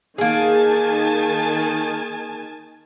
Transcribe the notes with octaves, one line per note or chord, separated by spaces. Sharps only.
D#3 A#3 G#4 G#5 A5